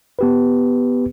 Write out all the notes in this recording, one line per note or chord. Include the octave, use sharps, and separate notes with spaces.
B3 G4 B4